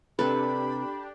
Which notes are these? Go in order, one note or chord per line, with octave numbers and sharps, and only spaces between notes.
C3 D4 G4 A4 B4 B5